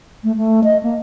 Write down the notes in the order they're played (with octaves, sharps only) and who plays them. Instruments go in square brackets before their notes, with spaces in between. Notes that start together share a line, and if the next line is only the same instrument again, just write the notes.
[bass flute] A3
A3
D#5
A#3